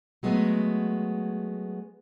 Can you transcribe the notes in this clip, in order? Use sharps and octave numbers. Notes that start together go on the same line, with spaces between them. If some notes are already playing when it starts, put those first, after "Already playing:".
F#3 G#3 A3 B3